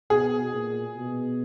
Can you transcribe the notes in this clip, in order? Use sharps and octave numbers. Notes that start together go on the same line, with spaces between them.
B2 G#4
A#2
B2